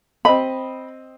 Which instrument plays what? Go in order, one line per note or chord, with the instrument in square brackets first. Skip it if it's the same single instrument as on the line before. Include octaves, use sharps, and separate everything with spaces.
[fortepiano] C4 D#5 [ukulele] B5